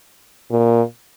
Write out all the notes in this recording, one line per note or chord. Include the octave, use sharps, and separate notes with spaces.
A#2